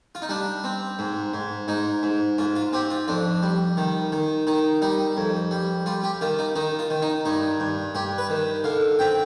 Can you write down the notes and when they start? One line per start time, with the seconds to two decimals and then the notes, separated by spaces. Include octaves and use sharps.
0.15 F4
0.22 D#4
0.29 G3 D4
0.64 C4
0.99 G#2
1.34 G#2
1.68 G#2 D#4
2.03 G#2
2.38 G#2 F4
2.56 F4
2.73 C4 G4
2.90 F4
3.08 F2 D4
3.42 G3
3.77 D#3
4.12 D#3
4.47 D#3 D#4
4.82 G3 D#4
5.17 F2
5.51 G3
5.86 G3 F4
6.03 G4
6.21 D#3 F4
6.39 D#4
6.56 D#3 D#4
6.79 F4
6.90 D#3
7.02 D#4
7.25 G2 D#4
7.60 G2
7.95 G2 G4
8.18 B4
8.30 D#3
8.64 D3 F5
8.99 C4 G5